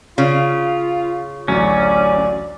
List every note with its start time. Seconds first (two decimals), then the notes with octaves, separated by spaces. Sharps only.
0.18 C#3 F4
1.48 A1 D2 F#3 C#4 D5